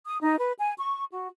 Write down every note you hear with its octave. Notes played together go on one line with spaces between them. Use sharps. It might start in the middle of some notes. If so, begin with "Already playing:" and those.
D#6
D#4
B4
G#5
C#6
F#4